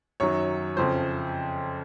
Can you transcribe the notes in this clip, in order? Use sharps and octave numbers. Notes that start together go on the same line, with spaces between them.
F#2 D#3 F#3 C#5
F2 C#3 F3 C5